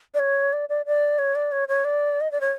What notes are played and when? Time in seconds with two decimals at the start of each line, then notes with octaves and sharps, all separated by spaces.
0.14 D5
0.19 C#5
0.53 D5
0.69 D5
0.86 D5
1.19 C#5
1.35 D5
1.52 C#5
1.68 C#5
1.85 D5
2.21 D#5
2.32 D5
2.41 C#5